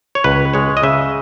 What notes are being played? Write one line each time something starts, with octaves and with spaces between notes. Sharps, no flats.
C#5
C#2 B4
G#3 C#5
D#5
C#3 E5